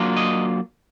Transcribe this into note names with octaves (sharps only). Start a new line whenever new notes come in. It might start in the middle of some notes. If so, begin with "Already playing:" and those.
Already playing: F#3 A#3 D4 F4
D#5